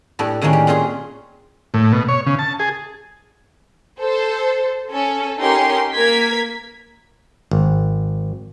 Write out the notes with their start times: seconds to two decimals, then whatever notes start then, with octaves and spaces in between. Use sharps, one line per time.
0.19 A2 B3 D4 G4 A4
0.42 A2 D#3 G#3 A#3 C#4 D4
0.53 G4
0.67 A#2 C#4 F4 G#4 C6
1.74 A2
1.93 B2
2.09 C#5
2.26 C#3
2.39 A5
2.59 G#4
4.00 A4 C5
4.92 C#4 A4
5.39 C#4 D#4 G4 A#4 C6
5.94 A#3 A#4 G#6 B6
7.51 G#1